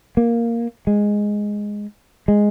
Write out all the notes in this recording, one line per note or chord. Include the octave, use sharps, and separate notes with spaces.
A#3
G#3
G#3